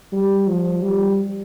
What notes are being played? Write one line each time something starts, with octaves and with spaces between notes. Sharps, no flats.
G3
F3
G3